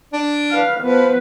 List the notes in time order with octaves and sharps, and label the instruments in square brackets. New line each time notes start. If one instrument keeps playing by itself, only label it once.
[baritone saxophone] D4
[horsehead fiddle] B4 F5
[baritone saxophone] F3 [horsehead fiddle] B3 B4